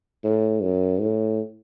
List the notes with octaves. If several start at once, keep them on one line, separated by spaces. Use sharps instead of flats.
A2
F#2
A2